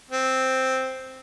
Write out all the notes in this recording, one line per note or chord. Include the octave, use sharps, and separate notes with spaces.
C4